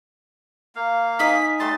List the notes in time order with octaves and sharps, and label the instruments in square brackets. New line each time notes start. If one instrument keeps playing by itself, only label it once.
[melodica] A#3 F5
[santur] D#4 D#5 G#5 [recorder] B6
[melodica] G3 A3 C6 [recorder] A6